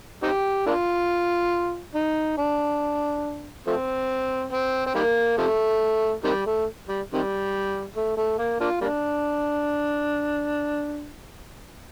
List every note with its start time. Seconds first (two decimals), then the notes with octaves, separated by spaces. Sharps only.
0.23 C4 D#4 G4
0.66 A#3 D4 F4
1.95 D#4
2.37 D4
3.67 F3 A3 C4
4.52 C4
4.86 C4
4.95 D#3 G3 A#3
5.38 C3 F3 A3
6.24 C3 D#3 G3
6.46 A3
6.88 G3
7.13 C3 D#3 G3
7.95 A3
8.17 A3
8.38 A#3
8.60 A#3 D4 F4
8.81 G3 A#3 D4